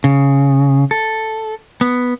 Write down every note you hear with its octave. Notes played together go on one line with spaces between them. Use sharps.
C#3
A4
B3